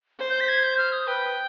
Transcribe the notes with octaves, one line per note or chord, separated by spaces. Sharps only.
C5
G6
B6
G#6
G6
F6
D#6
B4 G5